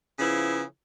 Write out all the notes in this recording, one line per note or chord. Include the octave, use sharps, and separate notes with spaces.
C#3 F3 B3 E4